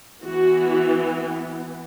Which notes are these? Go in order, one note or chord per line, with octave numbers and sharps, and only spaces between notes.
E3 B3 F#4